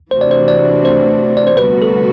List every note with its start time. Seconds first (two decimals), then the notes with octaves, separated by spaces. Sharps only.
0.11 C3 E3 A3 D4 F#4 C5
0.21 D5
0.31 C5
0.48 D5
0.85 C5
1.37 D5
1.47 C5
1.57 D2 C3 G3 B3 F#4 B4
1.82 A4